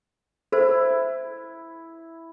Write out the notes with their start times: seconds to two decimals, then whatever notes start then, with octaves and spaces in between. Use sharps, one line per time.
0.52 E4 A4 C5